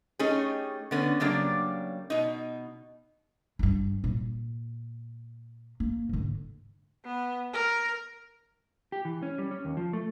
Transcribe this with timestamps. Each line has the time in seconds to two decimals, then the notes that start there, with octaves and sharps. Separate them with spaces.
0.19 A3 C#4 D#4 G4 G#4
0.91 D3 B3 C#4
1.20 C#3 F#3 G3 A#3 D4 D5
2.10 B2 D#4
3.59 G2 E4
4.04 A#2
5.80 A#3
6.09 G#2 D3
7.05 B3
7.53 A#4
8.92 G4
9.05 E3
9.23 C#4
9.38 G3
9.51 C#4
9.65 D#2
9.77 F3
9.93 A3